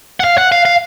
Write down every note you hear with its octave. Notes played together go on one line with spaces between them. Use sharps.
F#5
F5
F#5
F5
F5